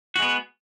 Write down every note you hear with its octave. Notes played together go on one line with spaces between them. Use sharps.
G#3 B3 F#4